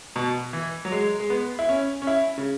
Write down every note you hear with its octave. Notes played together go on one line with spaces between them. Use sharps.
B2
E3
F#3
G#3
G#3
B3
E4
C#4
C#4
E4
C#3